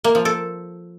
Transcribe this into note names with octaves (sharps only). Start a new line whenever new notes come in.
A#3
F3
A4